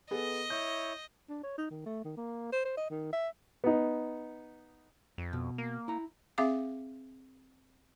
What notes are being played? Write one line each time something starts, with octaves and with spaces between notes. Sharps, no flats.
B3 G#4 A4 D#5
E4 C#5 G6
D4
C#5
D#4
D#3
A3
D#3
A#3
C5
C5
D#5
D#3
E5
B3 D#4
F2
B2
A#3
E4 A#5
C4 G#4 E5 F5 D6